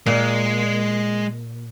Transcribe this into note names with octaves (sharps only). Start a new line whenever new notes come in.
A#2 G#3